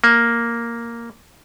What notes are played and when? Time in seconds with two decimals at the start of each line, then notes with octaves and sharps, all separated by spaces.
0.04 A#3